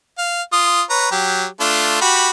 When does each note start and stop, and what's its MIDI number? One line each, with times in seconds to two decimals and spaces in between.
0.18 0.42 77
0.53 0.82 65
0.53 0.82 87
0.90 1.08 71
0.90 1.08 73
0.90 1.08 82
1.11 1.46 54
1.11 1.46 67
1.60 2.01 57
1.60 2.01 62
1.60 2.01 65
2.01 2.31 66
2.01 2.31 67
2.01 2.31 83